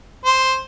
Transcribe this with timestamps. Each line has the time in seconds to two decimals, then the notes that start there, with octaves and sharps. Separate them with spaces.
0.25 C5